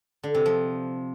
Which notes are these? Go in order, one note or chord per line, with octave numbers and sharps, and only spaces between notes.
D3
C3
F3